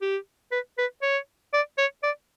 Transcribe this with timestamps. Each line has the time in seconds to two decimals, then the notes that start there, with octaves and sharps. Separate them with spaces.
0.02 G4
0.52 B4
0.78 B4
1.02 C#5
1.53 D5
1.78 C#5
2.03 D5